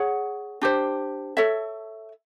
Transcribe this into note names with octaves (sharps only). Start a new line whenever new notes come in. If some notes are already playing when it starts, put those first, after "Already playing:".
Already playing: G#4 C#5 F#5
D4 G4 C5
A4 C#5 E5